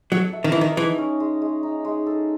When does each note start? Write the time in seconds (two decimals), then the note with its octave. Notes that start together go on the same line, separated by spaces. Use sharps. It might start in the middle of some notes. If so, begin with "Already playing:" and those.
0.12 F#3 A4
0.33 E5
0.44 D#3
0.52 E3 D#4
0.61 D#3
0.77 E3 G#3
0.98 C#4
1.20 G#3
1.42 G#3
1.63 D#4
1.85 G#3
2.06 A4